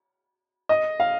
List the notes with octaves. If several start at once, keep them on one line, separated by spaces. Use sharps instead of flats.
D#5
F5